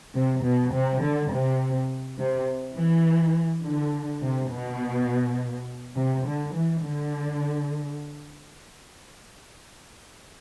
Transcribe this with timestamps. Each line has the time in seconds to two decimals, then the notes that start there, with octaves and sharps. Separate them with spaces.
0.15 C3
0.44 B2
0.73 C3
1.02 D3
1.31 C3
2.18 C3
2.76 E3
3.64 D3
4.21 C3
4.51 B2
5.96 C3
6.26 D3
6.54 E3
6.83 D3